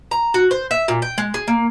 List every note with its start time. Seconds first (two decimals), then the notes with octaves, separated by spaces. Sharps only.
0.11 A#5
0.34 F#4
0.51 C5
0.71 E5
0.88 A#2
1.02 G5
1.18 G#3
1.34 G#4
1.48 A#3